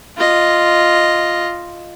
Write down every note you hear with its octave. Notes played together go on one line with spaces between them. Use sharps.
F4 D#5